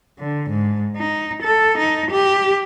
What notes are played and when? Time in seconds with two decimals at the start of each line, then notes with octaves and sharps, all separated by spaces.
0.19 D3
0.50 G#2
0.96 D#4
1.43 A4
1.78 D#4
2.11 G4